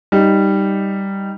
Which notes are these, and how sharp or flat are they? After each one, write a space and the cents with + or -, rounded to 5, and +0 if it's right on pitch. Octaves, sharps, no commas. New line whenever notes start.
G3 +0 D#4 +0